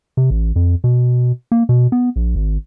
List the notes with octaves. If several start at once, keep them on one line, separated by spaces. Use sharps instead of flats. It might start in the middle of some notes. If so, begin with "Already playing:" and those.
C3
A1
F2
B2
A#3
B2
B3
A#1
G#1